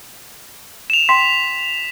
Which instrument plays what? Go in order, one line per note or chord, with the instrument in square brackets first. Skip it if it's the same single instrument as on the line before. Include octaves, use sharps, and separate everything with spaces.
[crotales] E7 F7
[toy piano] G5 C6 [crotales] B6